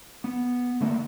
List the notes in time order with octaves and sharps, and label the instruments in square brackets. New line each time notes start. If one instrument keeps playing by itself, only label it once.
[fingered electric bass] B3
D3 A3 A#3